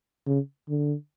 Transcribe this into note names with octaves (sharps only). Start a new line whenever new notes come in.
C#3
D3